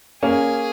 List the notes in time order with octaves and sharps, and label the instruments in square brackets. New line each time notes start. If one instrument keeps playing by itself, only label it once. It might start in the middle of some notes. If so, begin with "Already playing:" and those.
[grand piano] A#3 C#4 [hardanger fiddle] G#4